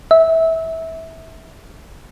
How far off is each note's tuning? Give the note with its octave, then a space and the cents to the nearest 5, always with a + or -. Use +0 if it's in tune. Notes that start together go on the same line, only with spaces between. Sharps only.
E5 -20